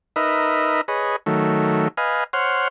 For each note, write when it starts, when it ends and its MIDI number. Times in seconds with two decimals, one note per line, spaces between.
0.16 0.81 63
0.16 0.81 70
0.16 0.81 71
0.16 0.81 75
0.16 0.81 76
0.88 1.16 68
0.88 1.16 71
0.88 1.16 73
0.88 1.16 75
1.26 1.88 51
1.26 1.88 54
1.26 1.88 57
1.97 2.24 71
1.97 2.24 75
1.97 2.24 77
1.97 2.24 80
2.33 2.68 72
2.33 2.68 73
2.33 2.68 78
2.33 2.68 84
2.33 2.68 89